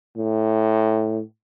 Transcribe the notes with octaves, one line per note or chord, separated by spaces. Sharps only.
A2